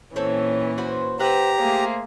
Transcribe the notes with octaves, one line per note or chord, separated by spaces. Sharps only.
A#2 E3 C4 C#4 A4 C#5
F#4 B4 C5
G4 B4 C5 E5 F#5 A#5
A3 A#3 G#4 C5